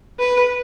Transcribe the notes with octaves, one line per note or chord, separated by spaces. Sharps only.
B4